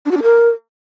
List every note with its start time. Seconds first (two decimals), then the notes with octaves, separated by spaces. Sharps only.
0.06 D4
0.11 F#4
0.17 D4
0.22 A#4